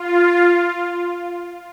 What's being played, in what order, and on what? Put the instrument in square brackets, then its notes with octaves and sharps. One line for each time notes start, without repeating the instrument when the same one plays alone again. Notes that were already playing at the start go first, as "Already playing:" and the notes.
Already playing: [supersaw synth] F4